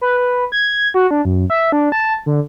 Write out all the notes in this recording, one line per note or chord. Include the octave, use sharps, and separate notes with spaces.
B4
B4
G#6
F#4
D4
F#2
E5
D4
A5
D3